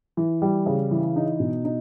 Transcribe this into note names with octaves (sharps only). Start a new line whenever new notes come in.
E3
G3
C#3
E3
D#4
B2
D#4